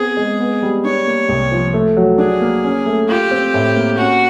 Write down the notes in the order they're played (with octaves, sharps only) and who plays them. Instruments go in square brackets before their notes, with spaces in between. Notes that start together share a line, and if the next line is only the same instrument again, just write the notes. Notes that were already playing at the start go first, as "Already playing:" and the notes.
Already playing: [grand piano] B3 C4 [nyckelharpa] G#4
[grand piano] G#3
B3
G3
[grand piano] D4 [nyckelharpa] C#5
[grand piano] A#3
C2
F3
A3
F#3
[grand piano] D4 [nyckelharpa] G#4
[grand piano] A#3
C#4
A3
[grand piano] F4 [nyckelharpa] G4
[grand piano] C4
A2
A#3
[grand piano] C#4 [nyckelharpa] F#4